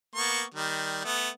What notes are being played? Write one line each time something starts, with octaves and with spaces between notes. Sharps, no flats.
A#3 B3 C#6
D#3 G3
A3 B3